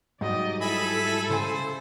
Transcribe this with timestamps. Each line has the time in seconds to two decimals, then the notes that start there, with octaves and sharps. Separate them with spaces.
0.21 G#2 F#3 G3 D5 D#5
0.61 E4 A4 E5 G#5 B5
1.30 C#3 C5 G#5